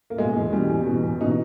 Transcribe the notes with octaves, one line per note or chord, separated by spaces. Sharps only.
A#3
B2 G#3
E2
B2 G3
E2
B2
E2
B2 D#4